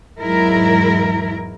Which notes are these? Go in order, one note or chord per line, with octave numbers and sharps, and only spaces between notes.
E2 G#2 F#3 E4 A#4